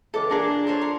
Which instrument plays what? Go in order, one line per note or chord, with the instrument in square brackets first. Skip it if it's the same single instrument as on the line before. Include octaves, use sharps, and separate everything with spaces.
[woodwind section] C#2 E3 G#3 [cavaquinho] A4 D6
[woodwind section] A#2 D4 [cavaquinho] G#4 A#4 D6
[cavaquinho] A4 C5 C#5
A#4